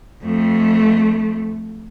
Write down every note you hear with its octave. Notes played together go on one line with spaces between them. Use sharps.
F2 A3